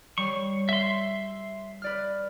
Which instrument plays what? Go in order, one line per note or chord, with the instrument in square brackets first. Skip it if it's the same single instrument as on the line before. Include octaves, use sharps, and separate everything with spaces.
[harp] G3 C#5 C7 [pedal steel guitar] C#6
[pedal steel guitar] E5 C6
[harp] B4 D5 F6